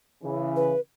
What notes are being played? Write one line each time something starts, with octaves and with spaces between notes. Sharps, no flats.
C#3 E3
B4